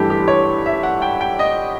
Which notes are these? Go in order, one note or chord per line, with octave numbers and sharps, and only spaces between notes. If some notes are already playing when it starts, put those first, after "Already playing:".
Already playing: G1 G2 E3 A3 D4 G4 A4
G4
C#5
E5
F#5
G5
G5
D#5